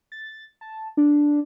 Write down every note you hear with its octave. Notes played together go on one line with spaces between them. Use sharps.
A6
A5
D4